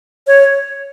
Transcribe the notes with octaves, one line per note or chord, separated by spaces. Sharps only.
C#5